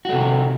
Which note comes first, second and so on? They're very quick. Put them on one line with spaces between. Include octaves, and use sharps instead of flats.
F#4 A3 C3 D#3